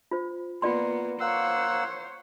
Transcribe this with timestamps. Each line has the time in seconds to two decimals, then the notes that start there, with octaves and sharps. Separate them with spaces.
0.11 F4 C5
0.62 A#3 B3 F4 D5 C6
1.20 A#3 C5 C#5 F#5 E6